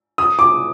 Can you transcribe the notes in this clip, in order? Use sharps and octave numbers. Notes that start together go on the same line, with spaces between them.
D#6
D6